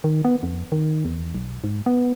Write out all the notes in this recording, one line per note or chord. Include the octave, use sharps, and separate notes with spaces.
D#3
B3
F2
D#3
E2
B1
G#2
B3